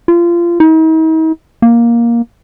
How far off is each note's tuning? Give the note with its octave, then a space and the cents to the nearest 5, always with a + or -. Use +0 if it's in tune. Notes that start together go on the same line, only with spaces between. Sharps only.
F4 -25
D#4 +45
A#3 +10